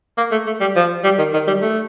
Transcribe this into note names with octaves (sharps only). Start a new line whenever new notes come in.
A#3
A3
A3
G3
F3
G3
D#3
D#3
G3
A3